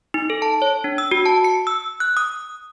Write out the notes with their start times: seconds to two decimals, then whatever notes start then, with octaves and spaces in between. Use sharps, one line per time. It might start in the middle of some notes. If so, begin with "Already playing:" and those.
0.14 D#4
0.30 A4
0.42 A5
0.62 C#5
0.84 D4
0.98 E6
1.11 F#4
1.26 A5
1.44 C#7
1.67 E6
2.00 F#6
2.17 D#6